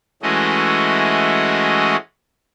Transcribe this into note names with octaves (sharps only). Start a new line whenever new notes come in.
E3 G#3 A3 C#4 F#4 D#5